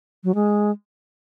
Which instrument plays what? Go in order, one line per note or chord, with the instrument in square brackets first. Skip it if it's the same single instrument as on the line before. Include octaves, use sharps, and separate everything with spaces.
[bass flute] F#3
G#3